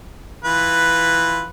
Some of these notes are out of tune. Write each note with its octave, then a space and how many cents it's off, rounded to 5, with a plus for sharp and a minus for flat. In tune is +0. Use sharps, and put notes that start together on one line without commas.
E3 +0 F4 +0 B4 +0